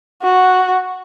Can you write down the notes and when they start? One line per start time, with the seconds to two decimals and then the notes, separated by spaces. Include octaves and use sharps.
0.23 F#4